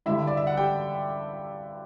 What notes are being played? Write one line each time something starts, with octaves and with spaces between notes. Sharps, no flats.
G2 D3 G3 E4 E5
D5
E5
F#5
G4 G5